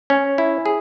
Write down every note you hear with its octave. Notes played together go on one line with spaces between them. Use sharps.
C#4
E4
G#4